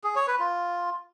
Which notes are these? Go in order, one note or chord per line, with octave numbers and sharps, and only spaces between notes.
G#4
C#5
B4
F4